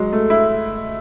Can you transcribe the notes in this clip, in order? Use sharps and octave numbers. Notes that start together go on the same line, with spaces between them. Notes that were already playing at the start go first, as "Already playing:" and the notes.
Already playing: F#3 G#3
A3
E4